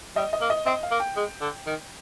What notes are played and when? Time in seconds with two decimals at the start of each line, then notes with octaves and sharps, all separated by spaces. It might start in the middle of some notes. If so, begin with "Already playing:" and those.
0.16 G3 D#5
0.33 D#5
0.41 A#3
0.50 D#5
0.66 C4 D#5
0.83 F5
0.91 A#3
1.00 G5
1.16 G#3
1.41 D3
1.66 D#3